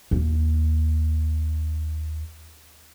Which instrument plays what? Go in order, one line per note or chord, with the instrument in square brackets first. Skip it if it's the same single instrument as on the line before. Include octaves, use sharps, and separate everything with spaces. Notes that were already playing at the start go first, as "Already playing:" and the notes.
[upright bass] D#2 A#3